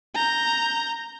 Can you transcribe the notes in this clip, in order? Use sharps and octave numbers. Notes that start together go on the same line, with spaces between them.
A#5 G6